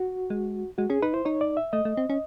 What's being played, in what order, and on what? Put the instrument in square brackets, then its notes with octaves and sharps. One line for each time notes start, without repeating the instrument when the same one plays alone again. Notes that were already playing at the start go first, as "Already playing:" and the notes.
Already playing: [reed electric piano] F#4
[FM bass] G#3
[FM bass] G#3 [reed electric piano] F#4
[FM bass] C#4 [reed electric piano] G#4
[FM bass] D#4 [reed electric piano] B4
[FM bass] E4 [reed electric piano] C5
[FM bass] D#4 [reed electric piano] C#5
[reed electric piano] D5
E5
[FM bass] A3 [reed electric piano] D#5
[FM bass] A3
C4
C#4